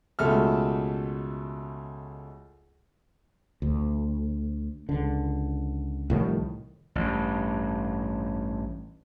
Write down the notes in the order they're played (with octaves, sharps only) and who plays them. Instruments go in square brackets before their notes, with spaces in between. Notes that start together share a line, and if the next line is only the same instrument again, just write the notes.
[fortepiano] C#2 B2 A3 A4 E5 F6
[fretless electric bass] D2
C#2 D3
C2 A2 D#3 F3
[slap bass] A1 G2